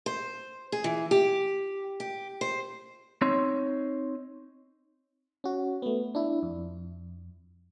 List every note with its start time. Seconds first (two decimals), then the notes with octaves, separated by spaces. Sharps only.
0.06 C5
0.72 G#4
0.84 E3
1.11 G4
2.00 G4
2.41 C5
3.22 C4 D#4 C#5 C6
5.44 C#4 F#4
5.82 A3 B3
6.15 D4 E4
6.43 F2